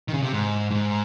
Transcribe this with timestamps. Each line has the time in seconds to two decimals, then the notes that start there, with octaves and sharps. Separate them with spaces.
0.08 D#3
0.14 C#3
0.22 C3
0.33 G#2
0.70 G#2